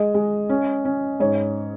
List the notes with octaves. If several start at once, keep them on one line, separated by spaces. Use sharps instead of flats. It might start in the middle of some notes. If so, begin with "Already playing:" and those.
Already playing: G#3 D#5
G#3
C#4
C#4
G#2 C#5